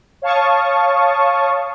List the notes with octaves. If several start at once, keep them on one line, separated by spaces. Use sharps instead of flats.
C#5 F5 A5 C#6 D#6